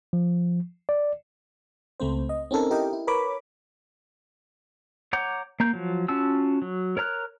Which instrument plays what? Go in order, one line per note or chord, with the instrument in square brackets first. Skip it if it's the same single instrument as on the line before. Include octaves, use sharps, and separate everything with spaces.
[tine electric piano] F3
D5
[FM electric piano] C#2 A3 C4 C5
D#5
C4 C#4 D#4 A4 A#4
E4 G4 A#4 D#5 G5
E4
A#4 B4 C#5 B5 D6
[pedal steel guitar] C#5 F#5 A#5 D6 G6
A#3 A#5 G6
F3 F#3
C#4 F4 F#4 A5 E6
F#3
A#4 C#5 A#5 F6 F#6